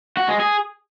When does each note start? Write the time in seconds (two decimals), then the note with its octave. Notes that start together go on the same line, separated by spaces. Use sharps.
0.17 F#4
0.28 G#3
0.40 G#4